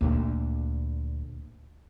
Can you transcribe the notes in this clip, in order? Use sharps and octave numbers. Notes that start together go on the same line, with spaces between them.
D2 A#2